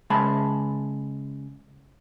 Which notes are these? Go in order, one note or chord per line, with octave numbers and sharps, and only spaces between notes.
C#3 G#3 E5 A5 B5